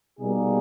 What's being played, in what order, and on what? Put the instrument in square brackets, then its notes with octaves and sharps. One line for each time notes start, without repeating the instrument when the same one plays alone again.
[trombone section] B2 G3 A#3 D#4 G#4